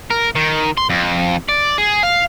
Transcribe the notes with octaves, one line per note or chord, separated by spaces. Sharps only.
A#4
D#3
C6
F2
D5
G#4
F5